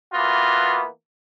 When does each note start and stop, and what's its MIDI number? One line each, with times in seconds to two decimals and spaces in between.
0.13 0.84 52
0.13 0.84 58
0.13 0.84 59
0.13 0.84 65
0.13 0.84 66